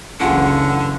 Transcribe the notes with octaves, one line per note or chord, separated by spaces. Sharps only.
F#1 C#2 D3 E3 C#4 F4 G#4 F#5